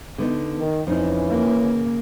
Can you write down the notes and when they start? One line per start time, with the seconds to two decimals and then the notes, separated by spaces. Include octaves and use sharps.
0.18 D3 B3 D#4
0.58 D#3
0.87 F2 E3 C#4 D#4 E4
1.29 A#3
1.63 C#3